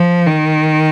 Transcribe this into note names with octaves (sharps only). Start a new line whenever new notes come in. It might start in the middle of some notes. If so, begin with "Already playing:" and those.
Already playing: F3
D#3